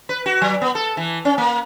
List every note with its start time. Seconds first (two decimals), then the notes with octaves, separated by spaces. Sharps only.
0.09 B4
0.26 F#4
0.41 F#3
0.62 B3
0.75 A4
0.97 E3
1.25 C#4
1.38 A#3